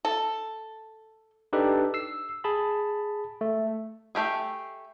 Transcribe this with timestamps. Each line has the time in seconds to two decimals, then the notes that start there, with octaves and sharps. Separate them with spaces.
0.05 A4
1.53 D4 D#4 G4 A4 B4
1.94 E6 C7
2.44 G#4 A5 B5
3.41 A3
4.15 A3 G4 G#4